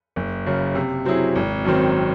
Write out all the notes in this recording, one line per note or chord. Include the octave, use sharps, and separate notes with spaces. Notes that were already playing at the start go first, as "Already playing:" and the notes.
F#1
F#2 C#3
C3
F#3 C4 E4 G#4
G#1
F#2 D#3 F#3 C4